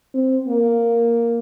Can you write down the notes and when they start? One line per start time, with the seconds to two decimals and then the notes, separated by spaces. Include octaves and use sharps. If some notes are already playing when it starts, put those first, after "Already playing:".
0.14 C4
0.48 A#3